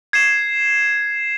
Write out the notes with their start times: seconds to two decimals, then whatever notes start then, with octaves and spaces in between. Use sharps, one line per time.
0.13 G#6 C7 E7